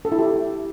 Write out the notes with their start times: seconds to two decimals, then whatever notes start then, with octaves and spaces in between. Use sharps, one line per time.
0.05 A4
0.12 E4
0.19 G4